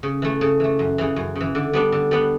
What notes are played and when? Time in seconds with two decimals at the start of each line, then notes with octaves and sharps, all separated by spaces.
0.03 C#3
0.22 E3 A3
0.41 C#3
0.60 E3 A3
0.79 F#2
0.98 C#3 E3
1.16 F#2
1.35 C#3
1.40 E3
1.55 D3
1.73 G3 B3 D4
1.92 D3
2.11 G3 B3 D4